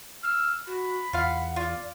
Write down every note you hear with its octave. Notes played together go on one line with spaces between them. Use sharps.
E6 F6
F#4 B5
E2 F4 F5 F#5
F4 D5 F5